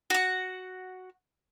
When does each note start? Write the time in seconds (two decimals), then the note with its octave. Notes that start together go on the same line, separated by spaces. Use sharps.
0.10 F#4 F#5